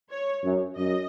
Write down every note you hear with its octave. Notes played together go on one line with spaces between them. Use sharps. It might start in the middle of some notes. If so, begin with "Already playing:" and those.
C#5
F#2
F#2 D#5